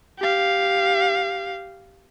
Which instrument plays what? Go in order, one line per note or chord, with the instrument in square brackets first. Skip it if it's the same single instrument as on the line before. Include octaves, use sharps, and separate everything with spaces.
[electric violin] G4 F5